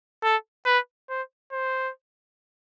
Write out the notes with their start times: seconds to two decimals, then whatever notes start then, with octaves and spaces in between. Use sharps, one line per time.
0.23 A4
0.66 B4
1.09 C5
1.52 C5